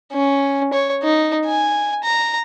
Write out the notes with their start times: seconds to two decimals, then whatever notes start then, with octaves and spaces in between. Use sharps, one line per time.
0.13 C#4
0.73 C#5
1.03 D#4
1.46 G#5
2.04 A#5